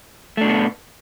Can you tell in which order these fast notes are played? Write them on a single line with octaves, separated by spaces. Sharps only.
A3 D4 B2 B3